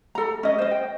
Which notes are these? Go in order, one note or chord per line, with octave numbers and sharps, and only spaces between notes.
A4 A#5
C#4 D#5
C5 D#5
G5